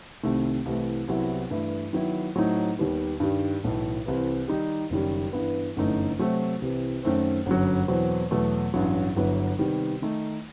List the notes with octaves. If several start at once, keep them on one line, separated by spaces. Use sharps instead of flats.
C2 C3 D#3 A3
C2 C3 E3 A3
C2 C3 F#3 B3 E4
G2 E3 A3 E4
D#3 F#3 B3 E4
A2 F#3 A3 C4 D#4
D#2 D#3 G3 B3
G2 D#3 G3
B1 A2 E3
C2 C3 E3
D#3 G3 D#4 G4
F#1 F#2 D#3 G3
G2 E3 B3
G1 F#2 E3 A3 D#4
C3 F#3 A3 C4 F#4
C2 C3 E3
F#2 D#3 A3 C4
G1 F#2 F#3
E2 B2 F#3 C4
E2 B2 F#3 A3
A1 G2 F#3
G1 G2 F#3 B3 E4
C3 D#3 G3 B3
D#3 A3 D#4